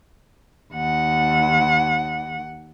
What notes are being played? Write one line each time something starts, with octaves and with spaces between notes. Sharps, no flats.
D#2 F#5